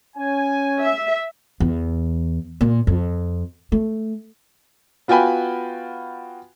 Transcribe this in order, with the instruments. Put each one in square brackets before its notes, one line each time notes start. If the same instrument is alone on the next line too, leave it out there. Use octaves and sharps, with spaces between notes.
[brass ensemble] C#4 G#5
[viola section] E5
[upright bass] E2
A#2
F2
A3
[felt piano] B3 F4 F#4 G5 G#5 B5